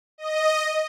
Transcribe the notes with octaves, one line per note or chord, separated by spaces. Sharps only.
D#5